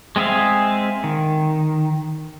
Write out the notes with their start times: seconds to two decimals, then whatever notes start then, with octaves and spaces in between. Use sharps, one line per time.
0.16 G#3 C4 G#4 E5 F5
1.04 D#3